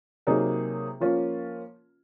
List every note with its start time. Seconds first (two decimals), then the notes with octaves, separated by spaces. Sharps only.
0.27 C3 F#3 A#3 D#4 G#4
1.00 F3 A#3 C#4 F4